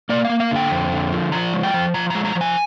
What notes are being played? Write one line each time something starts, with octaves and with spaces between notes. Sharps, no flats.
A#3 D5
A#3 F5
F5
D3 G5
F2
D3
F3
F3 A#5
G#3
G5
F3
F3 A#5
G#3 A#5
A#5
F3
G#5